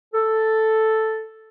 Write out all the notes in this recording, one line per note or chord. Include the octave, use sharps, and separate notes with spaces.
A4